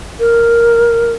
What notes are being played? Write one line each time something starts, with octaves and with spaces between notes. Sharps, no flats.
A#4